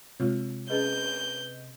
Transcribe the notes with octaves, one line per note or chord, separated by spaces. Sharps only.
C3 G#3 F4 C#5
C#4 G#4 B4 D#5 G6